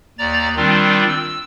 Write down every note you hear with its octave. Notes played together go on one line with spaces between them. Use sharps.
D#2 D5 A#5 A6
D#3 G3 C4 D4 F4
E6